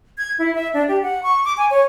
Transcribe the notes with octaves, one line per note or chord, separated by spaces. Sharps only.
G#6
E4
E5
D4
G4
F#5
C#6
D6
G#5
C#5